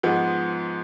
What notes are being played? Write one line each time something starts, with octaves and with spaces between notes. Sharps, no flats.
G#2 F3 G#3 B3